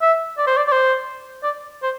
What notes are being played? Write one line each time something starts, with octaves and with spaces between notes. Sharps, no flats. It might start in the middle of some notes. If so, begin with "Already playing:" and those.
E5
D5
C5
D5
D5
C5
D5
C5